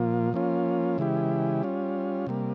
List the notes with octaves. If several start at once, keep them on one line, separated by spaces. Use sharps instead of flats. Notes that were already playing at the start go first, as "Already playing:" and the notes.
Already playing: A#2 F3 A#3 F4
F3 A#3 C#4 F4
C#3 E3 G#3 E4 G4
G3 C#4 F4
C3 G3 A#3